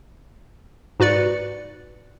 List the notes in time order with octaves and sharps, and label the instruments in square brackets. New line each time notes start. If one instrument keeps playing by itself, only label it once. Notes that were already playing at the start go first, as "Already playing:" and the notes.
[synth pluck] G#2 F#4 B4 D5 C#7